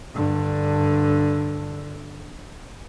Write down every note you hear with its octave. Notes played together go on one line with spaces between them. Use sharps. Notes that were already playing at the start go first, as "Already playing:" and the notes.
G2 D3